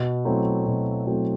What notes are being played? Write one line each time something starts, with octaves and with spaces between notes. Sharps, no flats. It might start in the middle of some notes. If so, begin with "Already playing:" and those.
Already playing: B2
F#3 A3 C4 E4
B2
F#3 A3 C4 E4